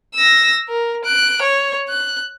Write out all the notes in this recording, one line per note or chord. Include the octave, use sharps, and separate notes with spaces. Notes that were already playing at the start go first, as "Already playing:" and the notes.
E6 A#6
A#4
F#6 D7
C#5
F#6